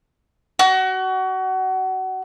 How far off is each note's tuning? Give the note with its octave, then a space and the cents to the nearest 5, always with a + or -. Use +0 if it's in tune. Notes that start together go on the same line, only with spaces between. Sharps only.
F#4 +25